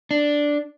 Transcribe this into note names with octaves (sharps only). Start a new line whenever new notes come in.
D4